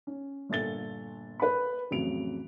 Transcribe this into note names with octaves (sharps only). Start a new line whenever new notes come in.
C#4
G1 A#2 A4 A6 G7
B4 B5
A1 F2 C#3 F#3 D7 F7